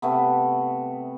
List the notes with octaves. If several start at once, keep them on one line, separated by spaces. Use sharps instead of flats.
C3 A3 B3